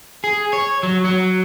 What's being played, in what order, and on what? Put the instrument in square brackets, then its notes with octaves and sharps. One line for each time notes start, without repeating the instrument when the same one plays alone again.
[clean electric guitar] G#4
C#5
F#3
F#3